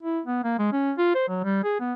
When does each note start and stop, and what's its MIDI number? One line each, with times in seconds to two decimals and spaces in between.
0.03 0.20 64
0.26 0.40 59
0.44 0.56 58
0.59 0.72 56
0.72 0.93 61
0.98 1.14 65
1.15 1.27 72
1.28 1.40 54
1.44 1.63 55
1.64 1.77 68
1.80 1.94 59